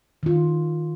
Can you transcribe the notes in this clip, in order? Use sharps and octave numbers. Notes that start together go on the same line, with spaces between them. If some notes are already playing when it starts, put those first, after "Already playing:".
D#3 F4